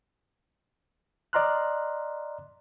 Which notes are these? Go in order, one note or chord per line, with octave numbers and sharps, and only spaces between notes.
D5 D#5 A#5 C6 F6 F#6